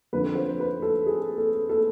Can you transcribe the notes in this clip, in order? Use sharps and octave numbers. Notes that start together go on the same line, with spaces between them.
F2 D3 F3 B4
C5
B4
A4
G#4
A4
A4